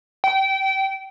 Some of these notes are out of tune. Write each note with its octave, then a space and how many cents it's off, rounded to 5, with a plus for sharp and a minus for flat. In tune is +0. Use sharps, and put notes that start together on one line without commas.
G5 -25